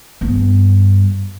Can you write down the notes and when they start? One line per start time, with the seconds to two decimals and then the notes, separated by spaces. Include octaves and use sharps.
0.21 G2 B3